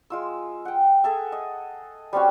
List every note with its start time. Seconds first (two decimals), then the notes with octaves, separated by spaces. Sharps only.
0.10 G#3 F4 E6
0.65 F#5 G5
1.04 G#4 A4 E5
1.32 D#5
2.13 G3 C4 C#4 F#4